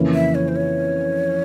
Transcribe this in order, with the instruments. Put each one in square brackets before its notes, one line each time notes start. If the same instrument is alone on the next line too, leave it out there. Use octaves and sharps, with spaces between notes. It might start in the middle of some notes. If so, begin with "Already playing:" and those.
Already playing: [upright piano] F2 C#3 E3 A#3 C#4
[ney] E5
C#5
C5
C#5